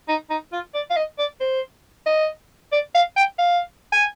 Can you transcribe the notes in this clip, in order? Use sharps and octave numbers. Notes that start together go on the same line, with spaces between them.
D#4
D#4
F4
D5
F5
D#5
D5
C5
D#5
D5
F5
G5
F5
G#5